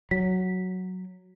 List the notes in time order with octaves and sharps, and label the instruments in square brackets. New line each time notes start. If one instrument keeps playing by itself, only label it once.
[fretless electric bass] F#3 [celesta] B6